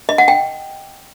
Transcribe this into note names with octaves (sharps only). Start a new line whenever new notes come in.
D#5
F#5
G5